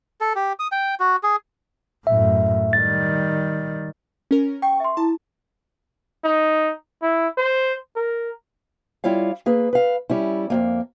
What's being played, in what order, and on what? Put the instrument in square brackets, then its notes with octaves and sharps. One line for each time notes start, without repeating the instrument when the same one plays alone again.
[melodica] A4
G4
D#6
G5
F#4
G#4
[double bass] F#2 A2 [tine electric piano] E5
[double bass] D#3 G3 [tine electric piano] A6
[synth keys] C#4 A#4
[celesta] G5 [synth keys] C#6
[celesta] E5 C6
[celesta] E4 [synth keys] A5
[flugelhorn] D#4
E4
C5
A#4
[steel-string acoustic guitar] G3 E4 F4 C#5 F5
A#3 G#4 B4
B4 F5
G3 C#4 E4
F2 G#2 A#3